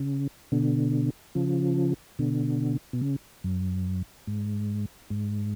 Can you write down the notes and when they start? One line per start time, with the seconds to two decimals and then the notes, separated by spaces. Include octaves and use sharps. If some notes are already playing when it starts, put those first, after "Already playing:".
Already playing: C#3
0.52 B2 D3
1.35 C#3 F3
2.19 B2 D3
2.93 B2
3.01 C#3
3.44 F#2
4.27 G#2
5.10 G#2